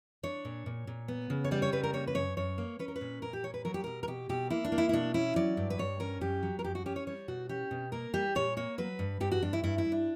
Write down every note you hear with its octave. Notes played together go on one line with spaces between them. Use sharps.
D4 C#5
A#2
A#2
A#2
B3
C#3
C#5
G3 D5
C#5
C#3 B4
A#4
A#3 C#5
B4
F#2 C#5
F#2 C#5
A#3
C#4 B4
A#4
B4
A#2
A#2 A#4
G4
A#3 C#5
B4
F#3 A#4
G4
B2 A#4
A#4
B2 G4
B2 G4
A#3 E4
D4
A#3
E4
E4
B2 D4
C#4 E4
F#3 D5
G2
B4
G2 C#5
C#4 A#4
F#2 G4
F#3
A#4
F#2 G4
F#4
C#4 G4
C#5
G3 C#5
B2 F#4
C#4 G4
B2
A#3 A#4
G3 G4
A#2 C#5
A#3 C#5
F#3 B4
G2
G2 G4
F#4
G2 D4
E4
G2 E4
E4
G2
D4